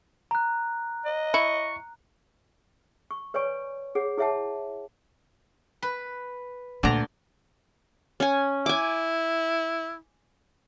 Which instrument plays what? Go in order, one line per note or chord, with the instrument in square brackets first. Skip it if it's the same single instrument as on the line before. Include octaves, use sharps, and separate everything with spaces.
[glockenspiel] A#5 F#6
[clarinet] D#5
[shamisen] E4 [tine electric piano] C#6 C#7
[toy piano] C#6
B4 C#5 D5 G#5 C#6
G#4 C#5 F#5
E4 G#4 C#5 E5 F#5 A5
[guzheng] B4
[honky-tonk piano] D2 [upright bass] A#2 A#3 [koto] D4 A#5
[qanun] C#4 G#5
[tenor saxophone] E4 [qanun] G#5 D6